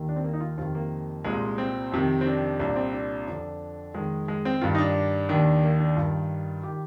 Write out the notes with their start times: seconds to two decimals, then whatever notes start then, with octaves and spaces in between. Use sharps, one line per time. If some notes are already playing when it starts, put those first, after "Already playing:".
Already playing: D#2 D#3
0.09 D4
0.16 C4
0.24 A#3
0.33 D#4
0.40 F4
0.57 F2 C3 D#3 F4
0.75 A#3
1.24 C2 A#2 G#3
1.58 C4
1.92 F2 C3 D#3
2.21 C4
2.26 D4
2.60 C2 A#2 D4
2.76 C4
2.93 D4
3.27 F2 D3 D4
3.94 F2 D#3 G#3
4.28 G#3
4.45 C4
4.61 G2 D#3 F4
4.75 D#4
4.78 D4
5.29 D#2 D#3 D4
5.63 A#3
5.80 D4
5.96 G2 D#3 F4
6.63 D#3 G4